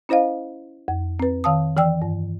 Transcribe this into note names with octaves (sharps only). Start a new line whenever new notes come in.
C#4 E4 C5 D#5 F5
F2
C4 B4
D#3 F5 A5 D#6
E3 D5 G5 E6
G2